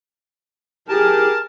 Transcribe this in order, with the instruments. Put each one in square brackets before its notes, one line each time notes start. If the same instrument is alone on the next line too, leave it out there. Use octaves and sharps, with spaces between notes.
[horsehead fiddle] G4 G#4 [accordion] A#4 A5